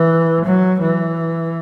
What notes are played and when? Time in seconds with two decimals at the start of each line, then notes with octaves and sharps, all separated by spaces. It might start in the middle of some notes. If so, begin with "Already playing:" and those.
Already playing: E3
0.45 F#3
0.81 E3